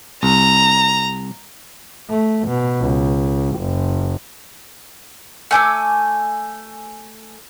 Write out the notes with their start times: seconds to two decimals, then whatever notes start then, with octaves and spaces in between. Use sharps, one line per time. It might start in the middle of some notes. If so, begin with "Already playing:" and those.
0.23 C2 A#5
2.10 A3
2.48 B2
2.81 C#2
3.57 F#1
5.51 A3 G#5 D6 E6